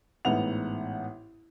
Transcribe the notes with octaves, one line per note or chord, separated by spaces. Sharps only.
A1 G#2 B3 E5 F#5 F7